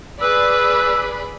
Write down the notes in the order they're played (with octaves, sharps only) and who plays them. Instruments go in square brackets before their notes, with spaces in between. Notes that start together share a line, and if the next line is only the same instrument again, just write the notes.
[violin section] G#4 D5 B5 [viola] B4 [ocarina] E6